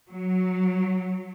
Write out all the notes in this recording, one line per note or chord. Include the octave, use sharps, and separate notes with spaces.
F#3